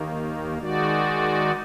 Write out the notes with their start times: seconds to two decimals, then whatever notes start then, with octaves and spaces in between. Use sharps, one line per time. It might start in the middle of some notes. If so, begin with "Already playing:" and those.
Already playing: D#2 D#3 A#3
0.58 D#3 G#3 D#4 F#4 D5